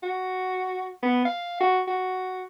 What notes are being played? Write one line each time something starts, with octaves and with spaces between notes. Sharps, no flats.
F#4
B3
F5
F#4
F#4